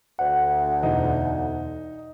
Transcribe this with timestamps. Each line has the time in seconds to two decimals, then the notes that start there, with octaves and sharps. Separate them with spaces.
0.19 D2 F#5
0.83 E2 B2 E3 D#4